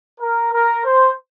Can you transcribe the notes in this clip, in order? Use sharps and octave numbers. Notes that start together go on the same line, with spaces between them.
A#4
A#4
C5